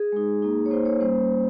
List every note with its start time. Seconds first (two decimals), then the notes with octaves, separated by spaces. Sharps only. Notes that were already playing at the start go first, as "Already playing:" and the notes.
Already playing: G#4
0.12 G#3 D#4
0.42 A#3 D#4
0.66 C#5
0.71 A#3 D#4 C5
0.85 C#5
1.00 G3 A#3 C#4 C5